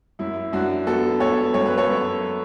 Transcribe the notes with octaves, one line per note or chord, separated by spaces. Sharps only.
F#2 E4
F#2 D4 F#4
B3 F#4 A4
B3 A4 C#5
F#2 C#5
B4
A4 C#5
F#2